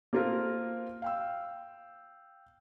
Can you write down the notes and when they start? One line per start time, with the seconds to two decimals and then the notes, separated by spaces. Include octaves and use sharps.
0.13 A#3 C4 F4 A4 A#4
1.02 F5 G5 E6